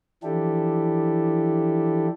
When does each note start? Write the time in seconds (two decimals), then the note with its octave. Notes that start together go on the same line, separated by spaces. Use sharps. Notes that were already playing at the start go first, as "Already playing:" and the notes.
0.23 E3 F3 D4 E4 G4 A4